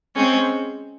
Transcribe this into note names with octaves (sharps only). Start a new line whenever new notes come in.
G#3 C4 C#4